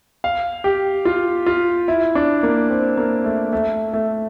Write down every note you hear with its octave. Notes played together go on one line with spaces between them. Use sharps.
F5
G4
F4
F4
E4
D4
A#3
C4
A#3
A3
A3
A3